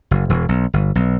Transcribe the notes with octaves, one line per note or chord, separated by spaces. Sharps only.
F#1
E1
B1
G1
B1